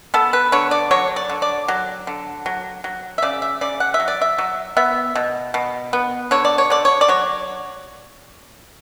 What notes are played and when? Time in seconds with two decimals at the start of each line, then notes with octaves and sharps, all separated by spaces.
0.14 B3 A4
0.33 B4
0.52 D3 C#5
0.71 D5
0.91 F#3 C#5
1.16 D5
1.30 D3
1.42 D5
1.68 F#3
2.07 D3
2.46 F#3
2.84 F#3
3.18 E5
3.22 C#3 D5
3.42 E5
3.61 C#3 D5
3.80 F#5
3.94 E5
4.00 F#3
4.08 D5
4.21 E5
4.38 F#3
4.77 B3 E5
5.15 B2
5.54 B2
5.93 B3
6.31 D3 C#5
6.45 D5
6.58 C#5
6.70 D3 D5
6.85 C#5
7.01 D5
7.09 F#3 C#5